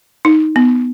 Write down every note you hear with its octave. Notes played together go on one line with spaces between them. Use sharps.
D#4
B3